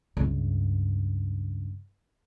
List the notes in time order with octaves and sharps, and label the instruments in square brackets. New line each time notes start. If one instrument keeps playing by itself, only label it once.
[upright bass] C#2 G2